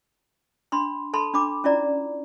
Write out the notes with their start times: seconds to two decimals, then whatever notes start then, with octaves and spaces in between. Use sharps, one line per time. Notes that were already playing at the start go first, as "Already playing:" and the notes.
0.72 D4 B5 C6
1.13 A4 A5 B5 C6
1.34 D4 B5 D6
1.64 C#4 E4 F4 D5 A#5